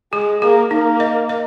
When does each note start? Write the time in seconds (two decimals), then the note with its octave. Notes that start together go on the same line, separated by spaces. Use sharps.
0.13 G#3 G#4
0.42 A#3 G#4
0.71 A#3 D#4
1.00 D#5
1.29 D#5